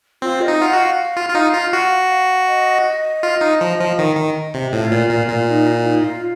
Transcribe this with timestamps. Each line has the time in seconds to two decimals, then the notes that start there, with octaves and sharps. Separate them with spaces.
0.22 C4 F4
0.41 D#5
0.48 D#4
0.60 F4 F#5
0.73 F#4
0.78 F5
1.17 F4
1.29 F4
1.35 D#4
1.54 F4
1.73 F#4
2.48 D#5
3.23 F4
3.41 D#4
3.61 F3
3.80 F3
3.99 D#3
4.17 D#3
4.54 C3
4.73 A2 F4
4.92 A#2
5.10 A#2
5.29 A#2
5.48 D#4
5.67 F4
5.86 D#4
6.04 F4